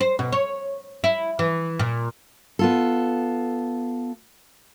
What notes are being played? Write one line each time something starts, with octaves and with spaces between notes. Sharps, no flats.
C5
B2
C#5
E4
E3
A#2
B3 F4 A4